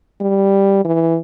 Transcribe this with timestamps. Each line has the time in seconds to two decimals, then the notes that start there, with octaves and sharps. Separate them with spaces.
0.21 G3
0.84 E3